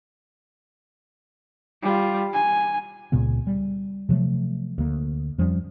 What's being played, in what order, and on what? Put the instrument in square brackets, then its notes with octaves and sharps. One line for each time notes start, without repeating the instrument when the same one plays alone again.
[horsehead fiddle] G3 F4
G#5
[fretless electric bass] C#2 A#2 C#3 B3
G3
C3 F3 F#3 A3
D2 A#3
F2 F3 G3 C#4